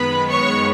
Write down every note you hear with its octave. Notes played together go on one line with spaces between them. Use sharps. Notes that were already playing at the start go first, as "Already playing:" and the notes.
Already playing: F#2 D#3 G#3 B3 B4 B5
C#5 C#6